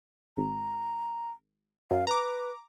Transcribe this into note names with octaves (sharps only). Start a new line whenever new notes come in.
G#1 A#5
F#2 F5
B4 A#5 D6